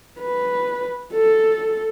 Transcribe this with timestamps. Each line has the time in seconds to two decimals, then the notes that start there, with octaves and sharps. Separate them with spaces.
0.20 B4
1.13 A4